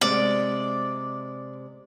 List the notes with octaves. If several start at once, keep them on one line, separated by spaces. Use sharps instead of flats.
C3 G#3 D5